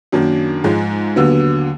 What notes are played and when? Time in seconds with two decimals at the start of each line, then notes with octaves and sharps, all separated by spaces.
0.12 F#2 D#3 F#3 A#3 D4
0.64 G#2 F3 G#3
1.16 D#2 D3 F#3 B3